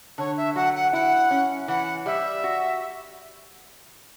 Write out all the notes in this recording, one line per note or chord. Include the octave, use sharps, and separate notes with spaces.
D3 C#5
E5
F#3 F#5
F#5
E4 F#5
C#4
E3 F#5
G3 E5
F#4